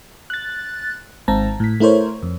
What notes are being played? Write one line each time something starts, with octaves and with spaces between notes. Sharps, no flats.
F#6 A6
G#1 G#2 C4 A5 A#5
A2 B6
A3 E4 A#4 C5 C#5
F2